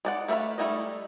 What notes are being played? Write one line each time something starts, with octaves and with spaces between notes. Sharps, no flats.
G#3 D5 F#5
A3 B4 E5 F5 B5
G3 A3 D#4 E4 D#5